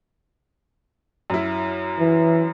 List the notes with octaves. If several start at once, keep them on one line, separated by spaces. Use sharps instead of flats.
F#2 E4
E3